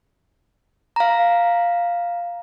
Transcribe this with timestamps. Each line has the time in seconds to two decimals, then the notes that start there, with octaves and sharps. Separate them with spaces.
0.96 F5 A#5